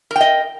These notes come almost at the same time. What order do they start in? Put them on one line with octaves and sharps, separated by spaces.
A#4 G5 D#5